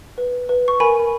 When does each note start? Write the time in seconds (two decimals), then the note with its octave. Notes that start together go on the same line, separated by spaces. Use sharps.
0.18 B4
0.49 B4
0.68 C#6
0.80 A#4 G#5 B5